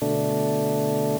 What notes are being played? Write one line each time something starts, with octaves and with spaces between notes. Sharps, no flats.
B2 D3 A3 D4